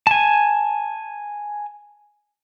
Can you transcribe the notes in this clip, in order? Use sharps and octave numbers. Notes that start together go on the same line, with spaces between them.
G#5 A5